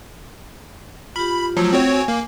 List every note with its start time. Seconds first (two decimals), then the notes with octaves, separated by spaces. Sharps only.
1.16 F4 G4 B5
1.57 F3 F#3 A3 F4 E6
1.73 C4 F#4 C#5 G5
1.91 G#5
2.08 A#3